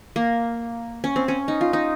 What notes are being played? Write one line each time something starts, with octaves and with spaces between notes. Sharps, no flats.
A#3
C#4
C4
C#4
D#4
F4
D#4